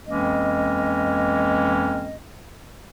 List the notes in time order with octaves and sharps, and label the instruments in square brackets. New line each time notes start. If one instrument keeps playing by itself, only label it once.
[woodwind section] F2 E3 G#3 A#3 C#4 D#5